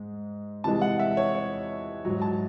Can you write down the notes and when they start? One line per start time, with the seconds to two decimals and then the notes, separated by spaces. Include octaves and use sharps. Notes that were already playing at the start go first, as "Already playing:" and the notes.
Already playing: G#2 G#3
0.64 C3 E3 G#3 A5
0.81 F#5
0.99 E5
1.17 C#5
1.35 C#5
2.05 G#2 F#3
2.22 A5